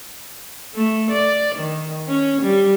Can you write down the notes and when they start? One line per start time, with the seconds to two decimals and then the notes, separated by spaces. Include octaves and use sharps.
0.74 A3
1.11 D5
1.55 D#3
2.08 C#4
2.42 G3